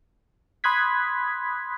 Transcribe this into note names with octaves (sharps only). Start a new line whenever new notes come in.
B5 C6 D#6 F#6 G#6 B6